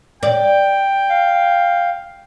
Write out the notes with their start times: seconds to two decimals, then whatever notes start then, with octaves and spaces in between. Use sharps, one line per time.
0.23 D5 G5
1.09 F5